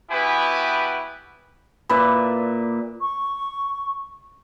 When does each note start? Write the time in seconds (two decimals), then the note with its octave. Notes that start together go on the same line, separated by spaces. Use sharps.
0.11 B3 E4 F#4 G4 B4 G#5
1.89 A#2 B4 D5 E5
3.01 C#6